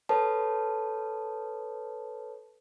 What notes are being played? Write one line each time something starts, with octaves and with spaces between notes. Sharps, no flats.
A4 B4 C#5 A5